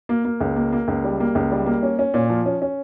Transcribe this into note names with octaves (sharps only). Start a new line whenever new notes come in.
A#3
A#3
C#2
A#3
A#3
C#2
G3
A#3
C#2
G3
A#3
C#4
C#4
A#2
F3
C#4
C#4